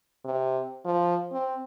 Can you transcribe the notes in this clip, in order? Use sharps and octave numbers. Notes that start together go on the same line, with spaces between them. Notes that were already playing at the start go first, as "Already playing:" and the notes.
C3
F3
C4